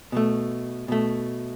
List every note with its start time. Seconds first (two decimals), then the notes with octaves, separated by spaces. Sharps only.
0.12 B2 A3
0.88 B2 A3